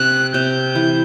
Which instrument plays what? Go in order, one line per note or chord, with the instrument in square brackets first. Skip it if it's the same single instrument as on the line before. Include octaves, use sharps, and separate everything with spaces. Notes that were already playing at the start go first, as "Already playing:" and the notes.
Already playing: [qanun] C3 [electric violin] F#6
[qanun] C3 [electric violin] G6
[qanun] E3